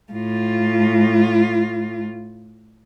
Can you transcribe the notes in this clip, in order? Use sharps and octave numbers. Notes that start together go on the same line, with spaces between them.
A2 F4